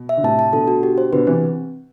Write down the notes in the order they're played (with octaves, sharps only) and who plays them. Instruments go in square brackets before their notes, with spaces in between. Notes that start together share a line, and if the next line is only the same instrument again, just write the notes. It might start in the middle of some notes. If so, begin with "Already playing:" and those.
Already playing: [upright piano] B2
[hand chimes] E5
[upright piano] D3
[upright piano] A2 C3 [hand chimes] A5
[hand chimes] A5
[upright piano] B2 D3 [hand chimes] A4
[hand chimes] F#4
G4
C5
[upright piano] B2 D3 [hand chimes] B4
[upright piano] C3 E3 [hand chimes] C4